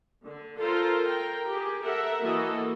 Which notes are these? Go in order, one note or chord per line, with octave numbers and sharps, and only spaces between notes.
D3
F4 A4 A#4 C5
A#4 G5
G4 G#4
A4 A#4 E5 F#5
E3 A#3 F#4 A4 D#5